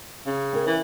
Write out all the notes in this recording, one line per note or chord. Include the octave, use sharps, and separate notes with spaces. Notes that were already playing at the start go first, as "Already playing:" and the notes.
C#3
A#4 C#5 G5
E3